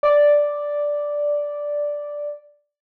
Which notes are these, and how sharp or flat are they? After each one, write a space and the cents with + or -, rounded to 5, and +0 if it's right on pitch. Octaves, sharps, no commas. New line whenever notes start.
D5 -5